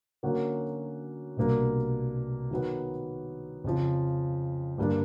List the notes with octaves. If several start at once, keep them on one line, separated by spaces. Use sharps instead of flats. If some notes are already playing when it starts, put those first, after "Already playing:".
D3 F#3 A#3 C#4 F#4
C2 B2 G3 A#3 D4
D#3 F#3 B3
F2 C#3 F3
G2 D3 G3 A#3 D4